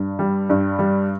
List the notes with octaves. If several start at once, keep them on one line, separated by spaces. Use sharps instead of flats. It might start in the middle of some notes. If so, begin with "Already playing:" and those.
Already playing: G2
G3
G2
G3